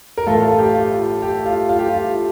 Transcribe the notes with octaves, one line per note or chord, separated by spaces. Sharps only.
A#4
A1 A2 A3 F4 A4
F4
G4
F4
G4
F4
F4
G4
F4